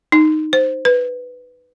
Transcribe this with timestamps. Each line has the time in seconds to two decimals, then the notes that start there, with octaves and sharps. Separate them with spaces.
0.12 D#4
0.53 C5
0.85 B4